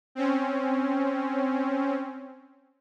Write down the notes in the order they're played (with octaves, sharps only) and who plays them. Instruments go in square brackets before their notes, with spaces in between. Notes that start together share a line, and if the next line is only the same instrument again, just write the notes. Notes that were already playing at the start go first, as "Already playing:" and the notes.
[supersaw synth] C4 C#4